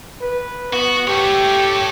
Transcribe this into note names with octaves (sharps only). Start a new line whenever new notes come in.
B4
B3 F#4
G4 A4 C#5